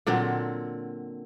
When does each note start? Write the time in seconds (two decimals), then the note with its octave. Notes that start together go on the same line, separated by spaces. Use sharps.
0.06 A#2 D3 F#3 C4